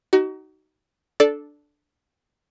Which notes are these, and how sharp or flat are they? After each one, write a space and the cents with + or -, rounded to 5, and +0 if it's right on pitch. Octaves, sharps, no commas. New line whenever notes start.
D#4 +0 F#4 +35
D4 +0 A4 -10 D5 -5